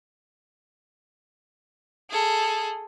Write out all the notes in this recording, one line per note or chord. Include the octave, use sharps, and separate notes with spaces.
G#4 A4